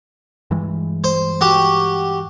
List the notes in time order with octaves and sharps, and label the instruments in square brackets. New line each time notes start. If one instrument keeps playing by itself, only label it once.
[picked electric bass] G2 E3 G#3
[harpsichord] C5
F#4 G4